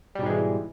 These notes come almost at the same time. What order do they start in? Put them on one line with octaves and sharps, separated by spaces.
G3 B2 G#2 G#3 E3